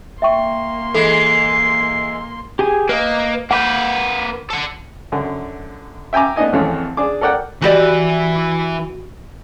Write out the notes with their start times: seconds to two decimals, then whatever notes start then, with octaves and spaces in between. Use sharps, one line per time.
0.22 A#3 E5 G5 C6 C#6
0.94 E3 G#3 A4 C7
2.59 G4 G#4 G#5
2.89 A#3 B4 D#5 D#6
3.51 A#3 B4 F#5 D6 G6
4.50 A4 F#5
5.12 F#2 D3
6.13 E5 G5 G#5 A#5 D6
6.36 A2 B3 D4 D#4 D#5 G#5
6.53 G#1 F2 E3 A3 C#5
6.97 D4 G#4 D6
7.21 A4 A#4 D5 F#5 G5
7.62 E3 F#4 G4 B4 D5